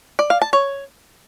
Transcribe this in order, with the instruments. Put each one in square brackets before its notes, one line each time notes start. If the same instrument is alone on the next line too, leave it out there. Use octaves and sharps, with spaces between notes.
[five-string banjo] D5
F5
A5
C#5